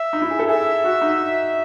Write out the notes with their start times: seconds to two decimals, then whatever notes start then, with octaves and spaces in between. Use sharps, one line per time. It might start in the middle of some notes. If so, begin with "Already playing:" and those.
Already playing: E5
0.13 D#4
0.22 E4
0.30 G#4
0.39 A4
0.48 G#4 E5
0.84 F#4
1.02 D#4